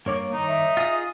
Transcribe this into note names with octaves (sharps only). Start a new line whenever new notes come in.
G2 A#3 C#5 D6
D#3 D#4 A#5
E5
F4 G#4 D#6